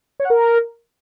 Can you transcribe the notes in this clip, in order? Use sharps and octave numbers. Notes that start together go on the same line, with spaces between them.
C#5
F#5
A#4